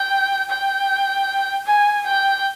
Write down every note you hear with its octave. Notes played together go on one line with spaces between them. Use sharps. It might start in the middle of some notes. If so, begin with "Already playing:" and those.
Already playing: G5
G5
G#5
G5